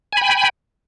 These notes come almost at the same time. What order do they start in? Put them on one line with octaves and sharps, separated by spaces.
G#5 B5 G5